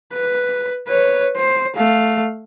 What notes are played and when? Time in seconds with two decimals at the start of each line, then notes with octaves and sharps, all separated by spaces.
0.13 B4
0.88 B4 C#5
1.37 C5
1.76 A3 F5